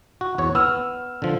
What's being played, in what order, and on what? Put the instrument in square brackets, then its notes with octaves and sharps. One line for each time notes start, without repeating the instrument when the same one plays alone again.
[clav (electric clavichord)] F#4
E2 C#5
[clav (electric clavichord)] B3 [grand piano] E6 F6
[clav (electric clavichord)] D3 F3